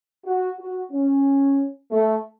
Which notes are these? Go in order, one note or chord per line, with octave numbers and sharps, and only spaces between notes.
F#4
F#4
C#4
A3